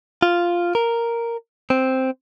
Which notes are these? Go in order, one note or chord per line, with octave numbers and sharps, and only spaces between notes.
F4
A#4
C4